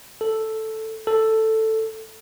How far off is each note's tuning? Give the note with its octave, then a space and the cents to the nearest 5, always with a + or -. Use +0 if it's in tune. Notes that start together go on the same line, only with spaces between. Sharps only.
A4 +0
A4 +5